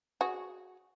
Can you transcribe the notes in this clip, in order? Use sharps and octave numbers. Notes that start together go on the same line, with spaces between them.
F#4 G#4